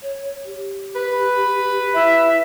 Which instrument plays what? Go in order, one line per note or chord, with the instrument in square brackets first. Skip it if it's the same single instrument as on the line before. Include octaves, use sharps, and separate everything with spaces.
[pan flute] C#5
G4
[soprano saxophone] B4
[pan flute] E4 [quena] E5